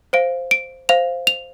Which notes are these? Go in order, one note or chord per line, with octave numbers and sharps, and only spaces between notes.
C5 F5 D7
D7
C5 F5 F7
F7